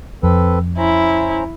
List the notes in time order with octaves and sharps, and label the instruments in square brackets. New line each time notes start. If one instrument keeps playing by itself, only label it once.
[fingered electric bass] F2 [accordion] C4 A4 B4
[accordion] C#4 C5 A#5 [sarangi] E4